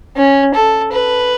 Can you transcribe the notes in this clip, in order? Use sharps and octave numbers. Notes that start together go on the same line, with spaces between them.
C#4
A4
B4